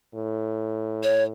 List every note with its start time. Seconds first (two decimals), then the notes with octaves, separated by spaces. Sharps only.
0.14 A2
1.03 C#5